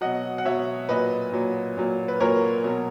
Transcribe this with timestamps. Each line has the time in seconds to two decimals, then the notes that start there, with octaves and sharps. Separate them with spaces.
0.01 B2 F#3 D#5 F#5
0.38 F#5
0.45 B2 F#3 C#5 E5
0.89 A#2 F#3 B4 D#5
1.33 A#2 F#3
1.77 A#2 F#3
2.08 B4
2.20 A#2 F#3 A#4 C#5
2.64 B2 F#3